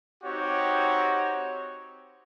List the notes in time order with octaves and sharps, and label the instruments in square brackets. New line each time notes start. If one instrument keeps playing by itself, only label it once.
[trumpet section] C4 D#4 F#4 G4 C#5